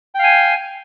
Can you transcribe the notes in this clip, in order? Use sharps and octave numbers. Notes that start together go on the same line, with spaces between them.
F5 G5 G#5